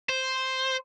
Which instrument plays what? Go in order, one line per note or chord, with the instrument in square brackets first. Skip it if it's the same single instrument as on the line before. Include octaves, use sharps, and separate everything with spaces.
[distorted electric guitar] C5